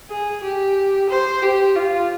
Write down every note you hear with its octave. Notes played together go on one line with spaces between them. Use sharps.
G#4
G4
C5
G4
F4